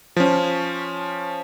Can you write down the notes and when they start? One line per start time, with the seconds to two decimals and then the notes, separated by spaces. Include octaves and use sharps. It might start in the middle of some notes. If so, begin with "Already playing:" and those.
0.16 F3 C#4